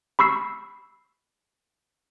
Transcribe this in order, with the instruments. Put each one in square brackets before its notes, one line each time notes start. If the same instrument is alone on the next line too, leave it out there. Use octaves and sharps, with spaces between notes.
[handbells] B5 C#6 E6 C7